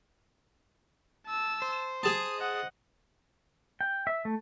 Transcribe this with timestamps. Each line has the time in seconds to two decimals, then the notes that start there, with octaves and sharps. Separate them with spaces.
1.27 A5 E6
1.62 C5
2.03 G#4 A5 D#6
2.38 D#5 F#5
3.81 G5
4.07 E5
4.25 A3